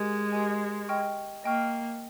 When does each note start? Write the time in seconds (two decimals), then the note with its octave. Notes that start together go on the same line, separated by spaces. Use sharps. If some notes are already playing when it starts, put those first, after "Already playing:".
Already playing: G#3 G4 A#4 D#5 G#5
0.32 G4 A#4 D#5 G#5
0.88 D#5 G5 C#6 F6
1.44 A#3 D#5 G5 C#6 F6